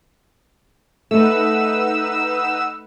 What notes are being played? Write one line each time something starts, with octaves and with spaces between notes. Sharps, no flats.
A3 D#4 B4 F#5 E6